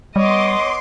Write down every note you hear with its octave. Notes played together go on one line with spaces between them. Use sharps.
G3 B3 C#5 D#5 C6 D6